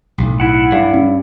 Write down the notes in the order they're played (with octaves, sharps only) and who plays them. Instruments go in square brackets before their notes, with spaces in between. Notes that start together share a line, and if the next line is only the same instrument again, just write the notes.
[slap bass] B1 A2
[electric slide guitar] E4 F#5
[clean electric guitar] G2
[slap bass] C#4